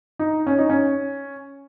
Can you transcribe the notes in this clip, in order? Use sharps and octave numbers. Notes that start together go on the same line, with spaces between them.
D#4
C#4
D#4
C#4